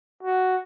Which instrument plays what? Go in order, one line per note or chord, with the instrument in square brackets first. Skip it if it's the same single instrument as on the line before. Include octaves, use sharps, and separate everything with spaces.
[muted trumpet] F#4